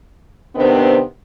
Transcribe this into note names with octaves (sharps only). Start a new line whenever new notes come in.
C3 D#3 B3 C4 D4